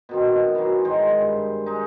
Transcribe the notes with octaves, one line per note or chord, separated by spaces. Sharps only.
B2 D#3 C4
E3 F#3
G#2 D#3 C5
G2
G#3 D#4